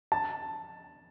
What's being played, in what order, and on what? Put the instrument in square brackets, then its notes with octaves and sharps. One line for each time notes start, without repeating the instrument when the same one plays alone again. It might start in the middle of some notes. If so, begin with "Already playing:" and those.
[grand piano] A5